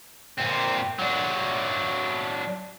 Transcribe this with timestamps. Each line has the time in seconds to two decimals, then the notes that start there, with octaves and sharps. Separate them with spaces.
0.39 A#2 C4
0.99 F#3 D4